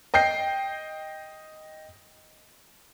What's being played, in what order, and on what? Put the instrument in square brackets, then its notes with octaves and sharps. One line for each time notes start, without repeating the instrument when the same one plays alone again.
[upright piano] D#5 G5 G6 C7